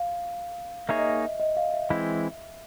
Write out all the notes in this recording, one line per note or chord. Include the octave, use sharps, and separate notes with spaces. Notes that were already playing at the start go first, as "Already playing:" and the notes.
Already playing: F5
A#3 D#4 G#4 C#5 E5
D#5
E5
D#5
F5
E5
E3 G#3 C4 E4 E5